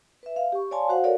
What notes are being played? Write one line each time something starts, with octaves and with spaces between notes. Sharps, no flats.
B4 E5
F5
G4 C#6
C#5 D5 F5 G#5 A5 C6
F#4 C5 F5 F#5
F#4 A4 A#4 C#5 D5 F5